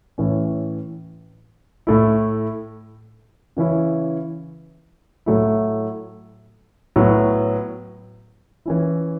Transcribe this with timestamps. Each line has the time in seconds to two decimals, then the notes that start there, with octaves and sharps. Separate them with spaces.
0.18 A2 E3 C#4
1.87 A2 A3 E4
3.57 C#3 E3 C#4 E4
5.26 A2 F#3 A3 E4
6.96 A2 F#3 B3
8.66 E3 C#4 E4